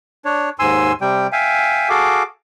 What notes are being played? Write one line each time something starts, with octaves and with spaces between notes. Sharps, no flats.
D4 C#5
D#2 G#2 G#5 C6 E6
C3 G3 G5
E5 F5 G5 G#5
F#4 G#4 A4 F5 D6